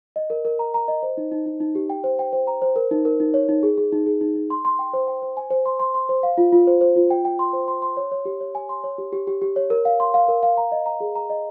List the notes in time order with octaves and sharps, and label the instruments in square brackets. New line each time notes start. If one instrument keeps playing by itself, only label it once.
[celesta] D#5
A#4
A#4
A#5
A#5
D#5
C5
D#4
D#4
D#4
D#4
G4
G5
C5
G5
C5
A#5
C5
A#4
D#4
A#4
D#4
C#5
D#4
G#4
G#4
D#4
G#4
D#4
D#4
C6
C6
G5
C5
G5
C5
G#5
C5
C6
C6
C6
C5
F5
F4
F4
C5
C5
F4
G5
G5
C6
C5
C6
C6
C#5
C#5
G4
C#5
G#5
C6
C#5
G4
G4
G4
G4
C#5
A#4
F5
C6
F5
A#4
F5
A#5
D#5
A#5
G#4
A#5
D#5